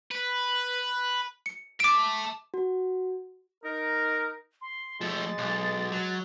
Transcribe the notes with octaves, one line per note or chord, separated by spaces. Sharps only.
B4
C#7
E5 A5 D6 D7
F#4
D#4 A#4
C6
F3 G#3 A3 A6
B1
F#3